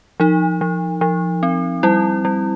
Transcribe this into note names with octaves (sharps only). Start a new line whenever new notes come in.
F3 D#4
F3
F3
C4
G3 E4
G3